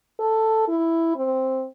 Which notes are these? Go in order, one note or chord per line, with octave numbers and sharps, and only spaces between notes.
A4
E4
C4